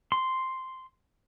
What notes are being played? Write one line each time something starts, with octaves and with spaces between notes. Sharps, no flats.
C6